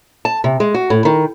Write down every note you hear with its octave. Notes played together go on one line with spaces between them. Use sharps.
A5
C3
G#3
F#4
A2
D#3